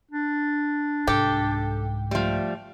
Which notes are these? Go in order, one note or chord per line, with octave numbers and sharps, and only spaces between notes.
D4
C2 G#2 G4 A4
F3 G3 A3